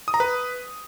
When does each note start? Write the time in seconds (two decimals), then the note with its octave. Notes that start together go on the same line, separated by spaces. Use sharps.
0.08 D#6
0.14 A#5
0.20 B4